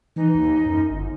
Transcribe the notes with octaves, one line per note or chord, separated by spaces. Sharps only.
E3 D#4
D#2
F#2
G1